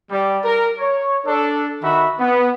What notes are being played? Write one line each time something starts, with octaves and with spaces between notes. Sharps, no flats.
G3
A#4
C#5
D4 A4
D#3 F#4 E5 B5
B3